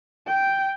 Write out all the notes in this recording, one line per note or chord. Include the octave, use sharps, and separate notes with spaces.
G5